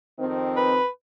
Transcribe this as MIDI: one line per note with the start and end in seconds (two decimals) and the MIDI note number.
0.19 0.78 41
0.19 0.78 51
0.19 0.78 60
0.57 0.87 71